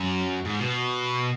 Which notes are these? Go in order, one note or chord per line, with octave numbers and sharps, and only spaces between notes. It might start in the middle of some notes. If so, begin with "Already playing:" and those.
Already playing: F#2
G#2
B2